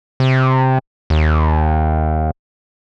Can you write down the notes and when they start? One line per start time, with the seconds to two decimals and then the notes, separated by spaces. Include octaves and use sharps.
0.20 C3
1.10 D#2